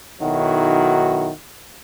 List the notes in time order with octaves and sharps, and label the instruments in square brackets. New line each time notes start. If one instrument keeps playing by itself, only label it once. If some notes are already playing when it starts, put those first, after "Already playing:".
[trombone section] B1 D#3 F#3 E4 F#4